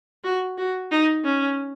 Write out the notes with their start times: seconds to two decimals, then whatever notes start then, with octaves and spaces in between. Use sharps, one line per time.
0.24 F#4
0.58 F#4
0.91 D#4
1.25 C#4